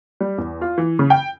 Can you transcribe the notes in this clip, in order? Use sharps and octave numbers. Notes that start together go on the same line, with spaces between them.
G3
E2
F4
E3
C#3
G5